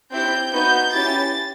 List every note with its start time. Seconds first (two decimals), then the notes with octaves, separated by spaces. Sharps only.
0.12 C4 E4 G4 G6
0.53 B3 D#4 F#4 G6
0.94 C#4 E4 G4 A6